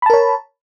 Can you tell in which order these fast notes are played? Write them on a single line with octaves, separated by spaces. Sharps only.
B5 A5 A#4 C#5